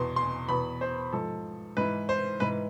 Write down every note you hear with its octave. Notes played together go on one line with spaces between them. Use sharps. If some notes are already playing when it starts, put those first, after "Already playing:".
Already playing: E2 B2 C6
C6
E2 B2 B5
C5
G#2 F3 A4
G#2 E3 B4
C5
G#2 E3 B4